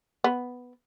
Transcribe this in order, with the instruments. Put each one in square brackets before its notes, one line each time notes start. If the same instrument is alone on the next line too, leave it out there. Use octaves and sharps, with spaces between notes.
[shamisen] B3